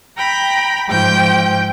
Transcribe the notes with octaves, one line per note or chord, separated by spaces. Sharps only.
G5 A#5 B5
G#2 F3 G5 G6